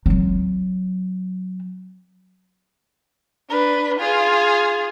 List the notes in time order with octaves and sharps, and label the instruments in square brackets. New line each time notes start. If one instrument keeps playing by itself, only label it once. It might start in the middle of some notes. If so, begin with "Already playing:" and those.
[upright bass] F#3 C4
[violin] D4 B4
F4 G#4